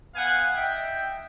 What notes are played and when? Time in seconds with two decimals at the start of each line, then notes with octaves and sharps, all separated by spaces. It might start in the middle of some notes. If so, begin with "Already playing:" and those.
0.15 B3 F5 F#5 G#5
0.55 D#4 E5 G5